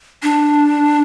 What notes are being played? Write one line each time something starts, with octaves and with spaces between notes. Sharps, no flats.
D4